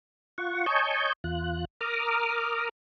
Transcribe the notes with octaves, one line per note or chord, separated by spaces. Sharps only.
F4 F#5 C#6
C#5 D#5 G#5 A5 C#6 G6
E2 F4 F#6
A#4 A#5 D6 D#6 F6